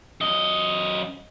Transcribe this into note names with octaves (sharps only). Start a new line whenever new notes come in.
F#2 D#5